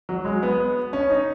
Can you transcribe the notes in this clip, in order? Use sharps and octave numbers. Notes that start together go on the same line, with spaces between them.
F#3
G#3
B3
C#4
D#4